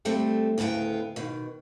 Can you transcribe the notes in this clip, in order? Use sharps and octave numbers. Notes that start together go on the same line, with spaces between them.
D3 G3 A3 C4
D2 A2 C#3 B3 G5
B2 D#3